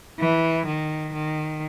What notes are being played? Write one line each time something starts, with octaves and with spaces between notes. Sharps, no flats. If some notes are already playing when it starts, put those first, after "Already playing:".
E3
D#3
D#3